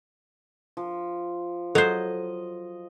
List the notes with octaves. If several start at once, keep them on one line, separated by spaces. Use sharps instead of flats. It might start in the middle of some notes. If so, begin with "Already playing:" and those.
F3
F#3 A4 C5 D#5